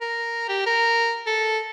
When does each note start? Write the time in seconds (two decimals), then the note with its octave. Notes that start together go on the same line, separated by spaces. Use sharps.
0.01 A#4
0.49 G4
0.66 A#4
1.27 A4